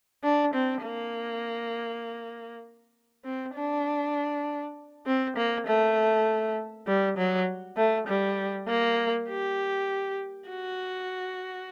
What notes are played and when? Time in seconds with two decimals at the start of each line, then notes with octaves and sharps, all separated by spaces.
0.24 D4
0.54 C4
0.84 A#3
3.25 C4
3.55 D4
5.06 C4
5.37 A#3
5.67 A3
6.87 G3
7.18 F#3
7.77 A3
8.07 G3
8.68 A#3
9.29 G4
10.49 F#4